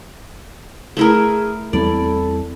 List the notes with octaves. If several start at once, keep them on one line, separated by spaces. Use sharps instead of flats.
A3 E4 G#4 A#4
E2 G3 C4 E4 A4 D5